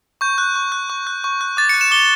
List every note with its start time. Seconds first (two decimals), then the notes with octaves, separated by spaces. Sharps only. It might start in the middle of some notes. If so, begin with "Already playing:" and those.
0.21 C#6 G6
0.38 F#6
0.56 C#6
0.72 F#6
0.90 C#6
1.07 F#6
1.24 C#6
1.41 F#6
1.57 D6 A6
1.69 F#6 C#7
1.81 E7
1.91 D6 G7